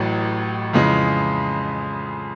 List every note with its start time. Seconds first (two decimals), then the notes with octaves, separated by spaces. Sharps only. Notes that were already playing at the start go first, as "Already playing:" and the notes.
Already playing: A1 A2 F#3
0.73 F2 C#3 E3 G#3